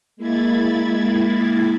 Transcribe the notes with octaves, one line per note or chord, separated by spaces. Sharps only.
G#3 A#3 E4 B5 G#6 A6